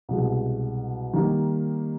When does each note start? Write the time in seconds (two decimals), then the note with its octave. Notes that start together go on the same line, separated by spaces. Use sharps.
0.09 C2 B2 G#3
1.13 D#3 G3 A#3